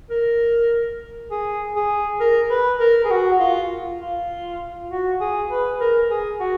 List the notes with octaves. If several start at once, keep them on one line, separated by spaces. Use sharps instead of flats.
A#4
G#4
G#4
A#4
B4
A#4
G#4
F#4
F4
F4
F#4
G#4
B4
A#4
G#4
F#4